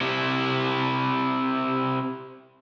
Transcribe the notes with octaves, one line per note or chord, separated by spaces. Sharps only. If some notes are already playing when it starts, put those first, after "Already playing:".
C3 E4